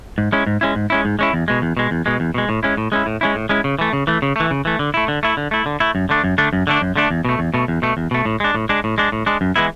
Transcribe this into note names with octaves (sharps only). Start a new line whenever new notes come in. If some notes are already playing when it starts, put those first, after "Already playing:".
G#2
G#3 C#4 E4
G#2
G#3 C#4 E4
G#2
G#3 C#4 E4
G#2
G#3 C#4 E4
E2
B2 G#3
E2
B2 G#3
E2
B2 G#3
E2
B2 G#3
A2
G#3 C#4 E4
A2
G#3 C#4 E4
A2
G#3 C#4 E4
A2
G#3 C#4 E4
C#3
E3 A3
C#3
E3 A3
C#3
E3 A3
C#3
E3 A3
D3
A3 E4
D3
A3 E4
D3
A3 E4
D3
A3 E4
F#2
D3 A3 D4
F#2
D3 A3 D4
F#2
D3 A3 D4
F#2
D3 A3 D4
E2
B2 A3
E2
B2 A3
E2
B2 A3
E2
B2 A3
A2
G#3 D4
A2
G#3 D4
A2
G#3 D4
A2
G#3 D4
F#2
E3 G#3 B3 E4